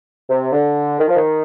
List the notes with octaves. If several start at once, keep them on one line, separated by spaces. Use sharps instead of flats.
C3
D3
D#3
F3
D#3